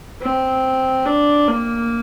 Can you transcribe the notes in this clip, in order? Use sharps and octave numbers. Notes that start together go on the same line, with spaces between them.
C4
D4
A#3